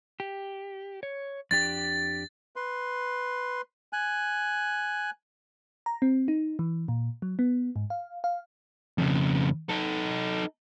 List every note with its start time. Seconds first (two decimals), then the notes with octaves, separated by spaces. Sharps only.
0.20 G4
1.03 C#5
1.51 F2 D4 G4 A6
2.56 B4 C6
3.93 G#5 F#6
5.86 A#5
6.02 C4
6.28 D#4
6.59 E3
6.88 A#2
7.22 F#3
7.39 B3
7.76 G#2
7.90 F5
8.24 F5
8.98 F2 C#3
9.69 D#4 A4